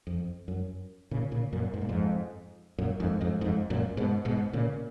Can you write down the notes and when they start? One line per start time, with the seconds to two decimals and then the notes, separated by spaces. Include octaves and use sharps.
0.07 F2
0.48 F#2
1.11 A#2 C#3
1.32 A#2 C#3
1.53 F#2 A#2
1.74 G#2
1.81 A#2
1.89 F2 G#2
2.78 F#2 A#2
3.00 F2 G#2
3.21 F2 G#2
3.41 F2 G#2
3.70 F#2 A#2
3.97 G#2 B2
4.25 G#2 B2
4.53 A#2 C#3